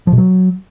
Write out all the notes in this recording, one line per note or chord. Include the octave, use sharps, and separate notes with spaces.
F3
B2
F#3